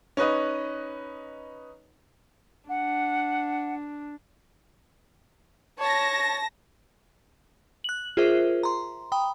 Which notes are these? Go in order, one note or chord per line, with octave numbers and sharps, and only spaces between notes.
C#4 D#4 B4 D#5
D4 F#5
C#5 A5 A#6
F#6 F#7
F4 G#4 A#4 C5 E5
A#5 C6
G5 B5 D#6